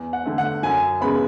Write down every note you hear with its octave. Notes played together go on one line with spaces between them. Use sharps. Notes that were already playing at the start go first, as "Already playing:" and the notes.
Already playing: E2
F#5
D3 A3
F#5
F#2 G#5
C#3 G#3 B3 B5